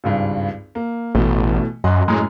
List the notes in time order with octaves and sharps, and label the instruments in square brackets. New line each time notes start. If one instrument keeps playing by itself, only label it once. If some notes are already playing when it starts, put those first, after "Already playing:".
[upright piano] G#1 C#2 G2
A#3
[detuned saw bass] A1 [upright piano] B2 E3 A3
[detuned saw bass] F#2 [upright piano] D#5 C6 F#6
[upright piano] F#2 A2 C#4 [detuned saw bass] G#3